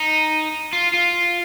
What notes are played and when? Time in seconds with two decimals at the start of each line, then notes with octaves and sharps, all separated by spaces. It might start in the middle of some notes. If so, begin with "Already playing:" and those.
Already playing: D#4
0.73 F4
0.94 F4